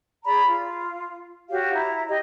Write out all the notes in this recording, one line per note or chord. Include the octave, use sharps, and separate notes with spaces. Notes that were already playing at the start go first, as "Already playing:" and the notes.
G#4 D5 A#5 B5
F4
F#4 G4 C#5 F5
E4 A#5
G4 D#5